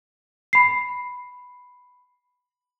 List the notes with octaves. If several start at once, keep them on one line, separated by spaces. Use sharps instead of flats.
B5 C7